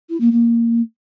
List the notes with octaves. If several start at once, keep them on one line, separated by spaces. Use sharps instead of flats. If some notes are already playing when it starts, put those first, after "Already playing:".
E4
A#3
A#3